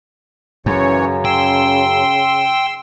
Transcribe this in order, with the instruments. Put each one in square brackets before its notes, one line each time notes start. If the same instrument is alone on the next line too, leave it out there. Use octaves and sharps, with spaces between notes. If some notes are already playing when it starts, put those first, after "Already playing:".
[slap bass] F#2 [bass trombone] C#3 [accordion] E3 C#5
[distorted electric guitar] G5 [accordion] C6 E6